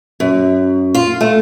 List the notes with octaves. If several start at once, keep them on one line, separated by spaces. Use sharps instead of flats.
F#2
F4
A3